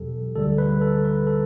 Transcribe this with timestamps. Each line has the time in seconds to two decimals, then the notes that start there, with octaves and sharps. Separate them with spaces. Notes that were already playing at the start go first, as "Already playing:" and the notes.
Already playing: E2 B2 F#3 G4 A4
0.36 D2 D3 G3 A4
0.58 B4
0.81 A4
1.04 B4
1.27 A4